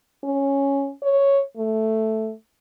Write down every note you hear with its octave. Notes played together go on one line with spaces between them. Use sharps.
C#4
C#5
A3